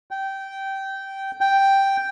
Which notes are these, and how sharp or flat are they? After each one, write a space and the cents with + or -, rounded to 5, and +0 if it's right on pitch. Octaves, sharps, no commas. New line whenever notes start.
G5 -15
G5 +0